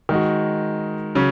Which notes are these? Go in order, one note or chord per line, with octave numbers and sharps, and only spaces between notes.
D#3 G#3 D#4 F#4
C#3 F#3 C#4